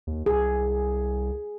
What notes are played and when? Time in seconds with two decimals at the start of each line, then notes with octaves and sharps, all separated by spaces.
0.07 D#2
0.26 C2 G#4